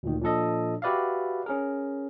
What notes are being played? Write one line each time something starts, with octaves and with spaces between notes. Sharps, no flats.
D2 A#2 D#3
A#2 F3 D4 A4 D#5
F#4 G4 B4 D5 E5 F5
C#4 G#4 A#4